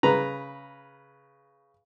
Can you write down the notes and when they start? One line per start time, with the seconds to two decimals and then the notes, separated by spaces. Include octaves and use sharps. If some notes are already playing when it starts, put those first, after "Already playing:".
0.03 C#3 B4 A#5